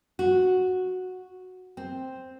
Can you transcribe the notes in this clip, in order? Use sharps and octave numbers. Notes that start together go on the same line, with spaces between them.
F#4
C4